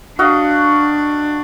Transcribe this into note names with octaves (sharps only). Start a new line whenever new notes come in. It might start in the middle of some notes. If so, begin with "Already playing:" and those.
D4 F#4 D#5 F5